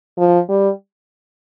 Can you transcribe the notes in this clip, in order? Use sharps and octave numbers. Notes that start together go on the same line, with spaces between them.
F3
G3